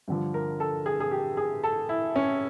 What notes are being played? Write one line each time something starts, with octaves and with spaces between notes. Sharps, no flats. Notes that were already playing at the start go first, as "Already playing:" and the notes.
G2 D3 F3
A#4
A4
G#4
G#4
G4
G#4
A4
E4
C#4